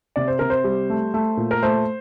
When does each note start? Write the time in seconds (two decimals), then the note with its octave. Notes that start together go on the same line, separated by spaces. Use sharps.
0.16 C3 D5
0.28 C5
0.39 C3 A#4
0.50 C5
0.64 G3
0.90 A3
1.14 A3
1.37 A#2
1.51 A#4
1.62 A3 C5